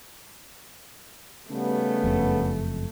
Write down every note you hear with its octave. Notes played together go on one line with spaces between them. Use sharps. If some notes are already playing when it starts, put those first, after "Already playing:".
C#3 G3 A3 B3
F#1 F2